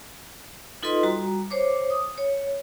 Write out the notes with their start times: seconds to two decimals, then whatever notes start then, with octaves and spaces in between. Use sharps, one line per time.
0.83 D#4 F4 A4 B4 D#5 C6
1.03 G3 F#4 A#5
1.51 C5 C#5 D6
1.90 D#6
2.18 C#5